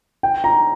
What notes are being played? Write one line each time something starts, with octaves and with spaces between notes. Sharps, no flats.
G5
A#5